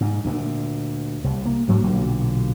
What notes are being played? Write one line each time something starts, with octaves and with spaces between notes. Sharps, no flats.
G#2
D2 A#2
C2
A#3
D2 G#2 F#3 A#3
B1 A#2 D3